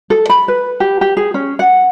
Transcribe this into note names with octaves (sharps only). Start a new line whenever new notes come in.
A4
B5
B4
G4
G4
G#4
C#4
F#5